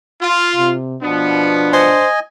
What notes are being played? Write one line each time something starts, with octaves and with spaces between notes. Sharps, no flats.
F4
C3
B2 F3 B3 D4
C5 D#5 G#5